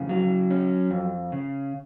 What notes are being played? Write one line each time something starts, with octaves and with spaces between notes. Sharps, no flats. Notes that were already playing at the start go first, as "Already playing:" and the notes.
Already playing: F2 C#3 F#5
F#3
C#4
F2
C#3